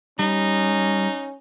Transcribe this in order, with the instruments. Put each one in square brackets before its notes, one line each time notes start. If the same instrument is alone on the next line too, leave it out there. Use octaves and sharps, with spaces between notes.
[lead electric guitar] G3 [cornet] C#4 [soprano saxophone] D#4